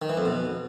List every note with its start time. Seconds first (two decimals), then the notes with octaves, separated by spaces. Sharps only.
0.02 D#3
0.10 E3
0.17 F2
0.25 B2